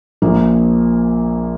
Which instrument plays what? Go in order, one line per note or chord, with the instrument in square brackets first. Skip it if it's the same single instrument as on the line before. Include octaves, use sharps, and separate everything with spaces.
[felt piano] A#1 A#2 F3 A#3